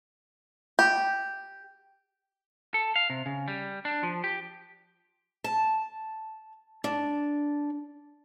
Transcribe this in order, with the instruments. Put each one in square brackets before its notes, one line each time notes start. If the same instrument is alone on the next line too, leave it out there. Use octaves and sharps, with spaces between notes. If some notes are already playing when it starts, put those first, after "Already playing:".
[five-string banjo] G4
[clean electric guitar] A4
F5
C3
C#3
G3
D4
F3
G4
[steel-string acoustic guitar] A5
D4